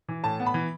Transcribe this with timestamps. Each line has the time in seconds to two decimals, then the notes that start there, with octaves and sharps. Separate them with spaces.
0.08 E3
0.23 A2 A5
0.40 B3
0.46 B5
0.54 E3